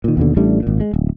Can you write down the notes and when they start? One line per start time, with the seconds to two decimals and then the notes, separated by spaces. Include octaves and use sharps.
0.04 A#2 D#3
0.17 D#2 B2 D3
0.37 A1 G3 A3 D4
0.63 G#1 A#2
0.80 G#3
0.94 D1